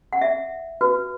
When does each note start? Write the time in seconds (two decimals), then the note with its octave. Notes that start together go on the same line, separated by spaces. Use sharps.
0.13 F#5
0.22 E5
0.81 F#4 B4